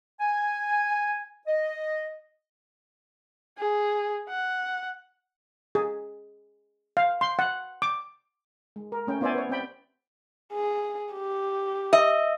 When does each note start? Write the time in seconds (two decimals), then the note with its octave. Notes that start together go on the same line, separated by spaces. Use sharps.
0.20 G#5
1.47 D#5
3.58 G#4
4.29 F#5
5.75 G#4
6.97 F5
7.21 C6
7.39 F#5
7.82 D6
8.76 G#3
8.92 A#4
9.07 A3 C#4 G5
9.21 B3 E4 C5 D5 E5 G#5
9.35 B4 C#5
9.49 C4 D5 G5 B5
10.53 G#4
11.13 G4
11.93 D#5 E5